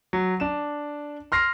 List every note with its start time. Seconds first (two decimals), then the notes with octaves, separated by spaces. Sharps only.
0.13 F#3
0.40 D4 E7
1.32 C6 F6 A#6 C7